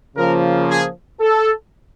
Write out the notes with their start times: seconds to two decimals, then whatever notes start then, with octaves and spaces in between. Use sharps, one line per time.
0.16 C#3 F3 A#3 A#4
0.69 G#4
1.21 A4